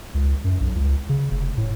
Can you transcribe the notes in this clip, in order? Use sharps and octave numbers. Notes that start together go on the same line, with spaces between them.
C#2
F#2
B1
C#2
C#3
F1
A2